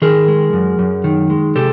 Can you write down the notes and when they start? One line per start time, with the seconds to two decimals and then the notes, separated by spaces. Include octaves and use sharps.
0.02 D#3 G#4 A#4
0.28 G#3
0.53 F#2
0.79 F#2
1.04 D#3
1.30 G#3
1.56 C3 G4 A4